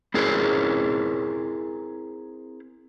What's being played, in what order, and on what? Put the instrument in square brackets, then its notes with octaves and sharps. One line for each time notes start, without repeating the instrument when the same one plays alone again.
[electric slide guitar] C4 E4 G#4 A#4